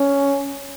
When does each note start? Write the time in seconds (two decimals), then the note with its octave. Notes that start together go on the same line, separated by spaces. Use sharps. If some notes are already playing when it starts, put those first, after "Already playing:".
Already playing: C#4